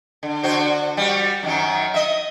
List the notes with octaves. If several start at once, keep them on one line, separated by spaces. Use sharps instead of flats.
D3
D3 F#4 C5
G3 F#4
F#2 D#3 F#3
D#5 E5